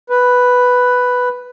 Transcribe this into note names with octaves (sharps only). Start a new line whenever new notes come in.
B4